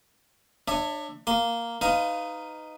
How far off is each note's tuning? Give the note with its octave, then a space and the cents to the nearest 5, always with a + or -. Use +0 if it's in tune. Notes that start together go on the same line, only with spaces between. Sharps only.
D4 +30 C#5 +0 E5 +0
A#3 +0 C6 -25
D#4 +0 B4 +30 F5 -5